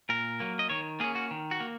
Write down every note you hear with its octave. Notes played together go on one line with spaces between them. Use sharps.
A#2 A#4
F#3 A#3
D#5
D#3 C#5
A#3 C#4 G#4
F#4
D#3
F#4
A#3